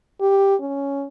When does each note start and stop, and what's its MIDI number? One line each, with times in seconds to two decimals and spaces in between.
0.21 0.55 67
0.61 1.06 61